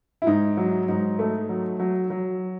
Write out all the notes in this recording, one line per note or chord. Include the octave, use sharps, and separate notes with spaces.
E4
G#2 D#4
F#3
G#2 D#4
A3
F#3
F#3
F#3